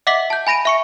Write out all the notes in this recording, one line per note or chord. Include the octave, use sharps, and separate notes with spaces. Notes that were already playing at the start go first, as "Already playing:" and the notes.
D#5 E5 F#5 D6 B6 F#7
A5 G6
G#5 B5 A#6 D7 D#7
E5 C#6 C#7